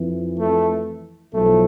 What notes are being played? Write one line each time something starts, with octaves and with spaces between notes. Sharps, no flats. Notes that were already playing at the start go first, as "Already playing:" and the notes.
Already playing: F2 E3
A3
B1 A2 F3 A3